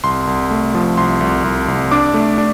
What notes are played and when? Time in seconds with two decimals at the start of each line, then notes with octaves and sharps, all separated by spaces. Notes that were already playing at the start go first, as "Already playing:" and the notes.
0.04 C2 C6
0.27 C2
0.51 A3
0.75 F3
0.97 C2 C6
1.21 C2
1.44 C2
1.68 C2
1.91 D4 D6
2.14 A3
2.38 D4